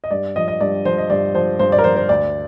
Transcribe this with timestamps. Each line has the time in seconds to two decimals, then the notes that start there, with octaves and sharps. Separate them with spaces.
0.04 D#5
0.11 G2 D5
0.36 F3 D#5
0.48 D#5
0.61 G2 D5
0.85 F3 C5
0.98 D#5
1.10 G2 D5
1.35 F3 C5
1.59 G2 C5
1.72 D5
1.78 A#4
1.84 F3 C5
1.97 C5
2.09 D2 D5